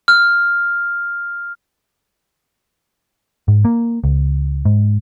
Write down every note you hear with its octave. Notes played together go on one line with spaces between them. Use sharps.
F6
G#2
A#3
C#2
G#2